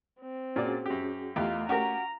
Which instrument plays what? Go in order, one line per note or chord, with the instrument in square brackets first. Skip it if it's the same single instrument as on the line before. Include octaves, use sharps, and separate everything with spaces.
[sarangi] C4
[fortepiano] A#2 D5 [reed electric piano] C#4 F#4 G#4
[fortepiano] F#2 G4
[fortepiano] E2 G4 [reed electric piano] A3 [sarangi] F4 [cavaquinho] A#4 D#5 F5
[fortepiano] C#4 G4 A#4 [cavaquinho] F#4 [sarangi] A#5